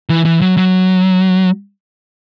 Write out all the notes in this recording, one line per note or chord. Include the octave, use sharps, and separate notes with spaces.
E3
E3
F#3
F#3